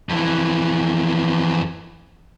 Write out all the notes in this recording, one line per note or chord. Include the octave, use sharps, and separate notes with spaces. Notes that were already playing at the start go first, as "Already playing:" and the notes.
F2 E3